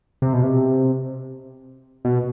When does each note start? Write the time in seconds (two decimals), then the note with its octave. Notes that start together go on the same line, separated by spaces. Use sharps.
0.22 C3
0.33 B2
0.43 C3
2.05 B2